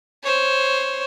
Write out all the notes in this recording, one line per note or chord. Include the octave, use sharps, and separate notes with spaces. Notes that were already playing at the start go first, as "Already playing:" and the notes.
C5 C#5